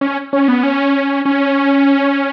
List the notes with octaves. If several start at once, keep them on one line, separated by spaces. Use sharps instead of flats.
C#4
C#4
B3
C#4
C#4